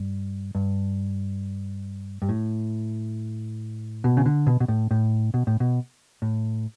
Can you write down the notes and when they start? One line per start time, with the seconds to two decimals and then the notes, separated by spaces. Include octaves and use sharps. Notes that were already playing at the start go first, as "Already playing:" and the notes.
Already playing: G2
0.55 G2
2.22 G2
2.29 A2
4.04 B2
4.17 C#3
4.26 D3
4.47 B2
4.60 B2
4.68 A2
4.91 A2
5.34 B2
5.47 A2
5.60 B2
6.22 A2